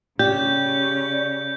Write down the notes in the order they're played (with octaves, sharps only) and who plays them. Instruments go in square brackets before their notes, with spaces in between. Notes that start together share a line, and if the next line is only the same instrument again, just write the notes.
[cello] C#3 C#4 [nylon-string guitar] G4 [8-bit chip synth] D5 [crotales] G6